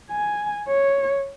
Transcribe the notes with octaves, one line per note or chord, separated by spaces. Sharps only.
G#5
C#5